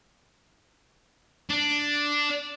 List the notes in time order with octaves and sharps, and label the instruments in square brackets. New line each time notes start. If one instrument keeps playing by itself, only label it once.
[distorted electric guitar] D4